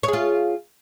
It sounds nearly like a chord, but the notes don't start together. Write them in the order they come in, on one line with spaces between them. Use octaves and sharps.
C#5 G#4 F4